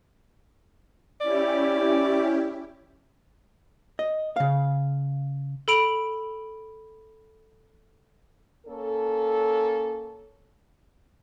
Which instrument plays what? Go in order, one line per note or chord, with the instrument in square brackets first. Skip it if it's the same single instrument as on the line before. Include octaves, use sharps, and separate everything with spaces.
[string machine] C#4 E4 G4 [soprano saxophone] D5
[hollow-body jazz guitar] D#5
C#3 F5
[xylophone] A4 B5 D7 F7 F#7
[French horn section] A#3 C#4 A4